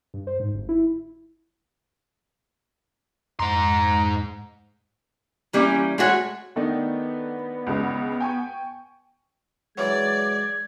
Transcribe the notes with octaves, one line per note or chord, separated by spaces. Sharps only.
G2
C5
G#2
G1
E4
F2 G#2 A#5 C6
E3 G3 A#3 C#4
G#3 A3 F#4 C#5
D#3 A3 B3 D4 D#4
C#2 C#3
G5 G#5 C#6
E3 F#3 G#3 D5 G#6